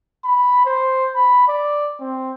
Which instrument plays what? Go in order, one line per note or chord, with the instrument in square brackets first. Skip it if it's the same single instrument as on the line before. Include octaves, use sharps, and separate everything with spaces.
[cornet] B5
C5
B5
D5
C4